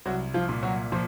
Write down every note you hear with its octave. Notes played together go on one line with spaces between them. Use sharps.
C2 F#3 F#4
F3 F4
A#2
F#3 F#4
A#2 F3